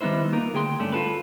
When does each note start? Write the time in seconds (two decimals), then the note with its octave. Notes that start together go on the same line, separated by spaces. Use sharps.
0.01 D#3 G3 B3 D#4 E4 C5
0.32 A#3 D#4 F4 A#4
0.54 D2 G#4 G5 C6
0.79 G2 A3 C#4 D4
0.92 F4 A4 B4